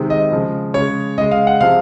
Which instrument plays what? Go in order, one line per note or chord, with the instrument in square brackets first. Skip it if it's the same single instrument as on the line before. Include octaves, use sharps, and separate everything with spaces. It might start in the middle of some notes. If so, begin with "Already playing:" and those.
Already playing: [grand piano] C3 D#3 G#3
D#5
C#3 F3 G#3
C#3 G#3 C#5
C#3 G#3 D#5
F5
F#5
C3 F3 G#3 F5